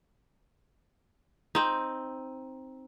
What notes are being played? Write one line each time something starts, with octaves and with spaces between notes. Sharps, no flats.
C4 D#4